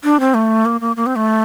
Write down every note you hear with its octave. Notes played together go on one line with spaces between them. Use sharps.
D4
C4
A3
A#3
A#3
A#3
C4
A3